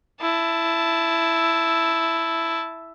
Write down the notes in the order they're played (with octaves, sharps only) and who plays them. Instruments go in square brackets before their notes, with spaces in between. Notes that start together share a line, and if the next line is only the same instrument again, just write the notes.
[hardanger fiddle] E4 A5